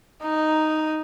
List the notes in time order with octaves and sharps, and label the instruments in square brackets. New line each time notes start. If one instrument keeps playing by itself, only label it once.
[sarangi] D#4